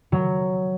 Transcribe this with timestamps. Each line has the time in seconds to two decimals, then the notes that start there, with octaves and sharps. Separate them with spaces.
0.12 F#3